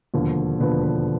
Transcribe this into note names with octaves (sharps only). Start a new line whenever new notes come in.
E1 D#2 D3 F3
E1 D#2 D3 F3 B4
B4